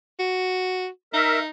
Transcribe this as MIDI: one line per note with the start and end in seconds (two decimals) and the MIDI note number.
0.19 0.88 66
1.13 1.50 63
1.13 1.39 70
1.13 1.39 76